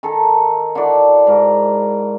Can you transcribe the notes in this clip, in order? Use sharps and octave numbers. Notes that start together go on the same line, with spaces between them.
D#3 A4
D3 E4 F#4 D5
G#2 A#4